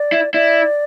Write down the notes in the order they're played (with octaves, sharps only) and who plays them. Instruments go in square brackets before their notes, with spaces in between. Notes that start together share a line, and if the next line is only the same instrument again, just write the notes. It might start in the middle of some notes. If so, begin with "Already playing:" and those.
Already playing: [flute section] D5
[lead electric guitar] E4
[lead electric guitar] E4 [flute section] D5